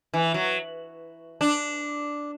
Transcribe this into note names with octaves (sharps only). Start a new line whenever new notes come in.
E3
F#3
D4